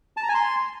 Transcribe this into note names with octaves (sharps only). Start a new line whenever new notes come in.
A5
A#5
G#5
C6